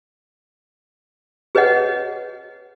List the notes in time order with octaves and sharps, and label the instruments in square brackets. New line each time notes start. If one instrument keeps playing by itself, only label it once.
[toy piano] G#4 B4 C#5 D#5 F#5